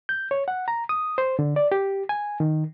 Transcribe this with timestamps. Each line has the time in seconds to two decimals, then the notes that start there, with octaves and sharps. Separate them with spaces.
0.09 G6
0.31 C#5
0.48 F#5
0.68 A#5
0.89 D#6
1.18 C5
1.39 D3
1.56 D5
1.72 G4
2.09 G#5
2.40 D#3